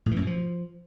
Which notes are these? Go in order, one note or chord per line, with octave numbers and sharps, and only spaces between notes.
A2
E3
F#2
B2
F3